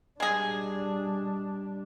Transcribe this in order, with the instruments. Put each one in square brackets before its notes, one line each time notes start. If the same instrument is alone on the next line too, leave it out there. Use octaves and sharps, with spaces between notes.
[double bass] G3 D4 [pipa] G#3 G#4